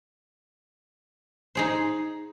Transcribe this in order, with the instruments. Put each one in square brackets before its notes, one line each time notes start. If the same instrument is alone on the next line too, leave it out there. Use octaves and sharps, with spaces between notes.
[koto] D#4 G#4 C5